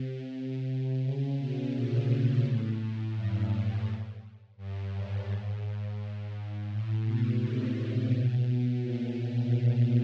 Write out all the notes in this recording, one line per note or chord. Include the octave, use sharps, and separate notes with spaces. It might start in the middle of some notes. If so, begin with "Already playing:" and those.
Already playing: C3
C#3
B2
A#2
A2
G2
G2
G#2
A2
B2
C3
B2
B2
A#2